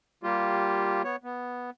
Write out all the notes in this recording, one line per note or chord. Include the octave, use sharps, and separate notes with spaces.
G3 A#3 F4 G4
B3 C#5
B3